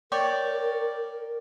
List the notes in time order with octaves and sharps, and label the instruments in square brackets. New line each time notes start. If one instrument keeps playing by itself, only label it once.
[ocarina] A#4 [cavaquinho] C#5 D5 G5